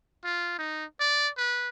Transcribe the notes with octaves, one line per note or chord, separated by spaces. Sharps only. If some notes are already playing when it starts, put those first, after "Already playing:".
F4
D#4
D5
B4